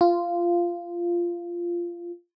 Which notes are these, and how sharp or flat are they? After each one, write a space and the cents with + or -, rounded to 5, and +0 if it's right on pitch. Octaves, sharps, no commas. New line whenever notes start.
F4 -10